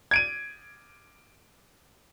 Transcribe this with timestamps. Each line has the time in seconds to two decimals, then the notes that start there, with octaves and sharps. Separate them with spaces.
0.11 G#6 D7 D#7